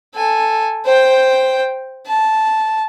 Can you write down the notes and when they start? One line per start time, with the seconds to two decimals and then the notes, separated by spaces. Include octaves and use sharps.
0.15 A4 G#5
0.86 C5 G5
2.07 A5